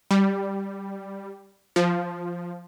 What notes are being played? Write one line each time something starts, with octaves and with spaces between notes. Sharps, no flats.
G3
F3